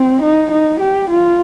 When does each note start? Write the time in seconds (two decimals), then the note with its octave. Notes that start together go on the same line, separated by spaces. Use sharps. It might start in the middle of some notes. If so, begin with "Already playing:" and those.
Already playing: C4
0.22 D#4
0.51 D#4
0.80 G4
1.10 F4